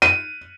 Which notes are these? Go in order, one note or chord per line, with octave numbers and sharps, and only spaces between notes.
D#7